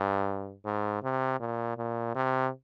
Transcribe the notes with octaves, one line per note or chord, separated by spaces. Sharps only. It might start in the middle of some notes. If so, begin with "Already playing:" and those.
Already playing: G2
G#2
C3
A#2
A#2
C3